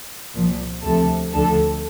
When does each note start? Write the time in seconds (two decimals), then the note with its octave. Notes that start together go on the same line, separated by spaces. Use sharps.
0.34 C2 A#2 F3
0.83 D2 C3 F3 A4
1.32 D2 D3 F3 A4